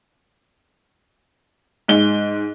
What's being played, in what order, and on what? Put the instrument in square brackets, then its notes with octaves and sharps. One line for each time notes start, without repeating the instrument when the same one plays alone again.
[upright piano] G#2 G7